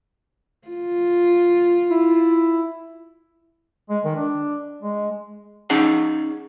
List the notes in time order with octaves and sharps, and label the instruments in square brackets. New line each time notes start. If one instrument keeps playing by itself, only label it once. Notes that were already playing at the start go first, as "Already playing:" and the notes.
[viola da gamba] F4
[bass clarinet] E4
[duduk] G#3
D#3
D4
G#3
[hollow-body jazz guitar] C#4 D#4 G#4 F#5